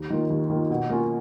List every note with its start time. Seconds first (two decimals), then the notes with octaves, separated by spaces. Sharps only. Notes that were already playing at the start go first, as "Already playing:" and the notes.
Already playing: D#2
0.10 D#3 A#3 F4
0.30 D#2
0.50 D#3 A#3 F4
0.70 B2
0.90 A#3 C#4 F4